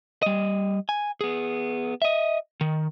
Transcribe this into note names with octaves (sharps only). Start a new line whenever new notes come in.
G3 D#5
G#5
B3 G#4
D#5 E5
D#3